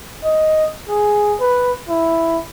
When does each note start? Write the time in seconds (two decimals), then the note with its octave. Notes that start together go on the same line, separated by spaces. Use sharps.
0.24 D#5
0.89 G#4
1.40 B4
1.89 E4